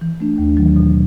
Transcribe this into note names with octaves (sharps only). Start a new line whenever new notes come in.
E3
A3 D4
D#2
D#3 F#3
B2